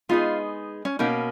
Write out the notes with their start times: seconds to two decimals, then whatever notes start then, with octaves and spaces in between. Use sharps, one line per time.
0.09 G#3 B3 D#4 F4 G#4
0.85 C#4
0.99 B2 A#3 C#4 D#4